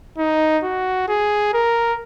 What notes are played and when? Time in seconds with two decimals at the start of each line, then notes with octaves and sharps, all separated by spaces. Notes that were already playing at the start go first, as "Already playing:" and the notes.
0.18 D#4
0.63 F#4
1.08 G#4
1.53 A#4